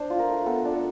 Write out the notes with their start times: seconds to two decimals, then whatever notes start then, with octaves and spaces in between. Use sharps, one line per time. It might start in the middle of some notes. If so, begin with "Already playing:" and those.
Already playing: D4 C5
0.10 F4
0.19 A#4
0.29 A3
0.46 B3 A4
0.65 D4
0.73 A4